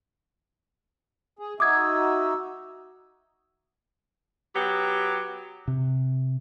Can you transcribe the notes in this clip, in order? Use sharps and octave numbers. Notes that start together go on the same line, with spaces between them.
G#4
D#4 F#4 E5 D6 D#6 G#6
F#3 B3 G4
C3